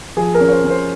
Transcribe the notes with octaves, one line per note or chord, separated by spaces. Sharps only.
F3 G#4
A#4
C#4
C#5
C5
C#4
C5